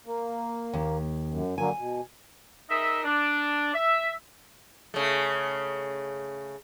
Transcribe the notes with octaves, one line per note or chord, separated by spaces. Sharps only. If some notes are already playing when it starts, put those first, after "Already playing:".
A#3
D#2
F#2
D3 F#3 A#3 G#5
B2
D#4 G#4 A#4 D#5 E5
D4
E5
C#3 A3